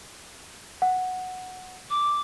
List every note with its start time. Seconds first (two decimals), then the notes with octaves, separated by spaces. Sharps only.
0.82 F#5
1.90 D6